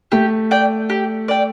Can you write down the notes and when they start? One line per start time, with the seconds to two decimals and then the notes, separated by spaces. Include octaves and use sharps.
0.12 A3 G4
0.51 D5 G5
0.90 G4
1.28 D5 G5